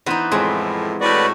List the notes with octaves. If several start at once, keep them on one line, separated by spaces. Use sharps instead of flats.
E3 B3 D#4 C5
F2 A2 G#3 C4
A2 F#4 B4 D5